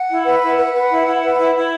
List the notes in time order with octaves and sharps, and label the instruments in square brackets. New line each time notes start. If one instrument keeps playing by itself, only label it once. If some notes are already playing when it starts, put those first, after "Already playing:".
Already playing: [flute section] F#5
E4
B4
E4 F#5
B4
B4
E4
E4
B4
E4
E4